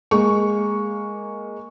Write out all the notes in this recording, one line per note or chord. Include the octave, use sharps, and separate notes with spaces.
G#3 A#3 C#6